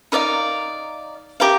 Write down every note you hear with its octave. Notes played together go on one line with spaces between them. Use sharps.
D#4 A#4 D5 F5
G4 A#4 F5